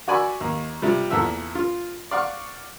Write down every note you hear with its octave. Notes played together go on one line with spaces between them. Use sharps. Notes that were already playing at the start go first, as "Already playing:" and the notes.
F#4 D5 G#5 B5 C#6 E6
D#2
C3 F3 G3
E2 A#2 A4 E5 E6
F4
D5 F5 F#5 C#6